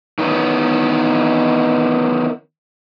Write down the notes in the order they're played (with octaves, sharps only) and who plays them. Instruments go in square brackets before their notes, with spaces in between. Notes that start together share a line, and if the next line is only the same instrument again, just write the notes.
[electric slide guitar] D#3 E3 B3 C#4